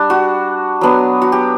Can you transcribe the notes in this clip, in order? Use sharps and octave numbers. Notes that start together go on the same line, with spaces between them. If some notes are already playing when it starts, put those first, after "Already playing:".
Already playing: G3 D4
F#4
F#3 B3 D4
F#4
G4